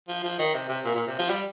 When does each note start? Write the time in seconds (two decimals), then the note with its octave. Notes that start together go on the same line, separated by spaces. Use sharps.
0.08 F3
0.24 F3
0.39 D#3
0.54 C3
0.69 C3
0.85 A#2
0.96 A#2
1.07 C3
1.19 F3
1.30 G3